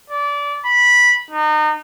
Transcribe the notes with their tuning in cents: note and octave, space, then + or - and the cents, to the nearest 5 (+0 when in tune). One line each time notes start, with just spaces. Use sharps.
D5 -25
B5 -15
D#4 -30